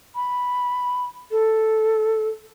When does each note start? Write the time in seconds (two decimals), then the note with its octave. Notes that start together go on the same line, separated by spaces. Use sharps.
0.15 B5
1.31 A4